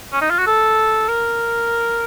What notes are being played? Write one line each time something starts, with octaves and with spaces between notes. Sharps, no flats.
C#4
D#4
F4
F#4
A4
A#4